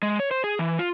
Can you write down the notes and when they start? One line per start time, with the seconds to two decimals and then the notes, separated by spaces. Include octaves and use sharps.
0.03 G#3
0.20 C#5
0.31 C5
0.44 G#4
0.59 E3
0.79 F4